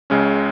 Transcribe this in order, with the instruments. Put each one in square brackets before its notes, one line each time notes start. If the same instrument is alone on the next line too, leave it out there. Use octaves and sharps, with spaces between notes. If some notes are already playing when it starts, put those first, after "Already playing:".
[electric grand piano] C#2 C#3 G#3 C#4